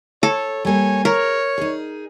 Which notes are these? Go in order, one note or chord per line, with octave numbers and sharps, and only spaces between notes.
A4 C#5
G3 A#3 C#5 G#5
G#4 A#4 C#5
D#4 G#4